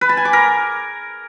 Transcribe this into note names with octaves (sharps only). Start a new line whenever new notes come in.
B4
A5
G#5
D6
A#4